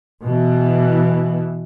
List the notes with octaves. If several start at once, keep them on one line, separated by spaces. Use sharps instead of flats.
B2 E3